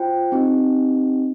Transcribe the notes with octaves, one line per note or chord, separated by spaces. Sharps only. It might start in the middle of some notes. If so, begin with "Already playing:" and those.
Already playing: F4 C5 G5
C4 D#4 G4